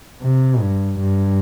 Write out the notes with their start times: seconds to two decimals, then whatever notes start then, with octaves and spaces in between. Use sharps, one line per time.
0.22 C3
0.61 G2
0.99 G2